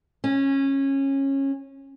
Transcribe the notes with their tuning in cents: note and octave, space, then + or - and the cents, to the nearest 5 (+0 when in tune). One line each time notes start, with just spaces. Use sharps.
C#4 -20